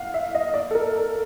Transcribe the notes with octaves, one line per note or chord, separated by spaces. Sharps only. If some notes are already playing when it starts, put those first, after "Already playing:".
Already playing: F5 F#5
E5
D#5
D5
A4
A#4